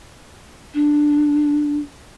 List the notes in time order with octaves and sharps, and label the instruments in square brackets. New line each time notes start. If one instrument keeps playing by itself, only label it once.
[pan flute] D4